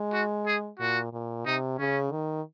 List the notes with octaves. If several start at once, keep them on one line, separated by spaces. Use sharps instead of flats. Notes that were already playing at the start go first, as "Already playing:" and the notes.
Already playing: G#3
F#4
G#4
A#2 F#4
A#2
C3 D#4
C#3 C#4
D#3